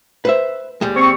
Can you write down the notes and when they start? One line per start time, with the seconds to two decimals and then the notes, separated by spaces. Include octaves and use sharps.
0.25 B4 C5 E5
0.81 D#2 G3 G#3
0.96 C4 C#6